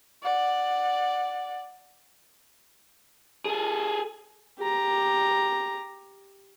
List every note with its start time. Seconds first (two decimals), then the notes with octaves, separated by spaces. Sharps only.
0.23 D5 F#5
3.45 G#4 A4
4.59 G4 A#5